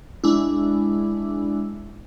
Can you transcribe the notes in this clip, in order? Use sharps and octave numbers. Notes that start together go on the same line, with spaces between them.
G#3 D4 E4